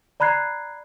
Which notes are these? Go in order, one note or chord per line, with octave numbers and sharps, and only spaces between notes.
D5 A#5 B5 F#6 G#6 C7